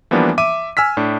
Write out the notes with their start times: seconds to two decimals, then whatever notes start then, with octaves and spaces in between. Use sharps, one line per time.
0.11 E3 F3 G3 A#3 B3 D4
0.38 E5 D6 D#7
0.77 G#5 E6 F6 B6
0.97 A2 D4